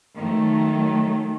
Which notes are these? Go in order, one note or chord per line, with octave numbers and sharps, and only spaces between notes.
D#3 F#3 A3